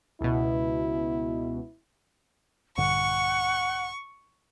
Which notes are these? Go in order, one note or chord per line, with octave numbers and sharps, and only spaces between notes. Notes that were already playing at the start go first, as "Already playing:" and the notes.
C#2 B2 E4
A#1 G2 D3 F#5 C#6